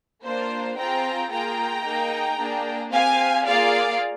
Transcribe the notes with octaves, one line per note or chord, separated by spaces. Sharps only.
A#3 D4 F4 C5
C4 F4 G#4 G5 A#5
A#3 F4 G#4 G5 A#5
A#3 D#4 G#4
A#3 D4 G#4
C4 G4 F5 G#5
A#3 F4 G#4 D5 F5